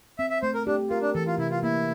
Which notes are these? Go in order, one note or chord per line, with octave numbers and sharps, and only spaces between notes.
C4 E5
E5
A3 C5
A#4
D4 G4
F4 A#4
D4
E3 A4
F4
C3 E4
F4
A#3 E4